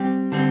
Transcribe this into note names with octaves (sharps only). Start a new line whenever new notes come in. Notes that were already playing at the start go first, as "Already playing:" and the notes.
Already playing: G3 C4 G4
D3 G3 C4